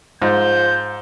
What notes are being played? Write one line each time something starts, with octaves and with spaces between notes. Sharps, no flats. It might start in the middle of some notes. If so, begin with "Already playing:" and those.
G#2 F3 G6